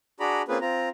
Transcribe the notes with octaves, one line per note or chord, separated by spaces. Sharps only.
D4 F#4 G#4 D5 A#5 B5
A#3 C4 C#4 F4 G#4 B4
C4 F4 A#5